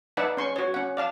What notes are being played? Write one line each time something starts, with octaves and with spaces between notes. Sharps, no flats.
D#4 B4 D5 E5 F#5 A5
C#4 C6 C#6
F#4 C#5
C#4 F#5
D5 F5 A5